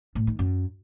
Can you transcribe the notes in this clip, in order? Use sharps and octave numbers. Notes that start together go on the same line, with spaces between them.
A2
D#3
F#2